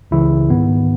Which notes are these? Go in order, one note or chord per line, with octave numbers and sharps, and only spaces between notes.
C#2 C#3 E3 E4
G#2 D#3 B3